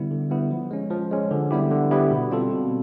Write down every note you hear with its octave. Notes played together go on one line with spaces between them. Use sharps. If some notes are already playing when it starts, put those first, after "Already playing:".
Already playing: D3 G3 B3 E4
D3
G3 B3 E4
F3
G#3 C#4
F3
G#3 C#4
D3
G3 B3 E4 G4
D3
G3 B3 E4 G4
B2
G3 C4 F4 A4
B2